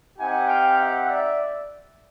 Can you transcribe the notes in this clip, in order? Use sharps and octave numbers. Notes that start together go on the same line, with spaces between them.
C4 D#4 G4 F#5 G#5
F5 G5
E5 F#5
D5 E5